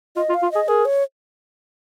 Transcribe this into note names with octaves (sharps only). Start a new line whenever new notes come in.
F4 D#5
F4
F5
F4
G#4 D#5
G#4 A#4
C#5